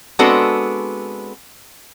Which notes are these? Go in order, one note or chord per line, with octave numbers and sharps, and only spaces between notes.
G#3 B3 C4 D4 F#4 A4